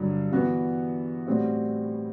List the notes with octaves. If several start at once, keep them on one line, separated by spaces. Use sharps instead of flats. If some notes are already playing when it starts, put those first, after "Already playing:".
Already playing: G2 D3 F#3
E3 B3 F#4 B4
A2 G3 C4 F#4